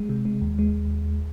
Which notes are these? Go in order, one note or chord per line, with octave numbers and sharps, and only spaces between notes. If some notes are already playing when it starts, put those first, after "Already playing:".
Already playing: G#3
C3
G#3
D#2
G#3